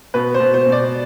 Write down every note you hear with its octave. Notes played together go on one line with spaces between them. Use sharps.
B2 B4
C5
B2
C5
B2
D5